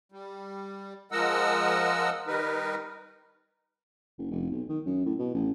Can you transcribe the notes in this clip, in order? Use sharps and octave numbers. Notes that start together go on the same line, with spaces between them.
G3
F3 G#3 A#4 D#5 F#5 E6
D#3 G3 D#4 A#4 B4
F#1
F1
B1
D#3
F#2
A2
B2
A1